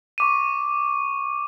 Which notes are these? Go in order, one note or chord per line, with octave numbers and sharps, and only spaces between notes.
C#6 D6 D#7